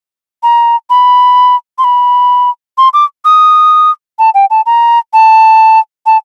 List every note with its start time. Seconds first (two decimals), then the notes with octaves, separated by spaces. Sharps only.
0.43 A#5
0.90 B5
1.78 C6
1.84 B5
2.78 C6
2.93 D6
3.25 D#6
4.19 A5
4.34 G5
4.50 A5
4.66 A#5
5.13 A5
6.06 A5